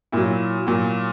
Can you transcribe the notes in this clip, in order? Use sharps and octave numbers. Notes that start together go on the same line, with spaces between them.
A#2 F#3 E4
A#2 F#3